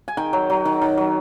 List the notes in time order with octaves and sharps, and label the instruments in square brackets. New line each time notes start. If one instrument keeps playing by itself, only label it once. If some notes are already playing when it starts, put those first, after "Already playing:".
[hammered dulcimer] G#5
D#3 G5
F#3
F#3
D#3
D#3
F#3